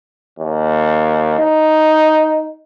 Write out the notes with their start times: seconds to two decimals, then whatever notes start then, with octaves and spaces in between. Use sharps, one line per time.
0.39 D#2
1.39 D#4